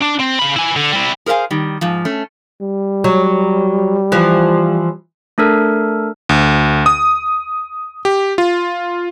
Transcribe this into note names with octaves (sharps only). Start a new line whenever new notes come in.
D4
C4
C#3 B5
E4 G#5
D3
G3 E4
G#4 A#4 C5 D#5 F5 G#5
D#3 G3
G#2 F3
A3 C#4
G3
F#3
E3 F3
A3 D4 A4 A#4
D2
D#6
G4
F4